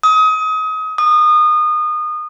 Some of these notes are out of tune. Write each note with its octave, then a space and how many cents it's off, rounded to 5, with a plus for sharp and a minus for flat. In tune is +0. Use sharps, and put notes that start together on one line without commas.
D#6 +30
D#6 -25